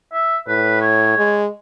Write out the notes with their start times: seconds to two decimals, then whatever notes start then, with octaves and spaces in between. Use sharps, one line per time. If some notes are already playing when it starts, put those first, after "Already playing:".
0.13 E5
0.48 A2 B4
0.81 C#5
1.18 G#3